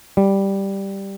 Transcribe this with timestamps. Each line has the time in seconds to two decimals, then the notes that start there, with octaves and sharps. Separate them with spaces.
0.17 G3